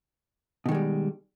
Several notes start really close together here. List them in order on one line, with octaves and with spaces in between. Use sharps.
B2 D#3 G#3 G3